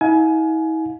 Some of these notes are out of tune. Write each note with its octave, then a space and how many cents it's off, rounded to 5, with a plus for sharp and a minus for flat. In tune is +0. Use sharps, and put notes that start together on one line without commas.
E4 -45 F5 +40 G#5 +25